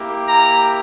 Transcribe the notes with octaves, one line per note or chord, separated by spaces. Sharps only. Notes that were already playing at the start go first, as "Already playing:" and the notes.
Already playing: A#3 E4 G4
A#5